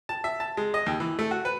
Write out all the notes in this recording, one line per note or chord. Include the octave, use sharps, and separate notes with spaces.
A5
E5
A5
G#3
D#5
D#2
E3
A3
F#4
B4